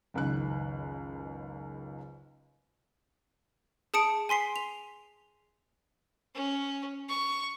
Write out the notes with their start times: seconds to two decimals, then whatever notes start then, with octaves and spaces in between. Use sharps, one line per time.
0.14 F#1 C#2 D#3 F#6
3.94 G#4 A5 D#6 C#7 D7
4.29 G#5 C6 B6 C7
4.56 F7
6.35 C#4
7.09 C#6